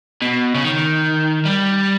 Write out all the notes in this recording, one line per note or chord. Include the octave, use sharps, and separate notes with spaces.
B2
C#3
D#3
G3